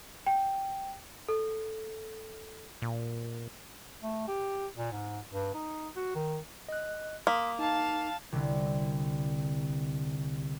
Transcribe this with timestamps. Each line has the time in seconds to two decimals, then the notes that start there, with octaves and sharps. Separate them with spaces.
0.26 G5
1.29 A4
2.82 A#2
4.02 A3
4.28 G4
4.77 A#2
4.92 G#2
5.31 G2
5.54 D#4
5.96 F#4
6.15 D#3
6.69 D#5 F#6
7.27 A#3 C6 D#6 B6
7.59 D#4 F5 A5
8.32 C2 D3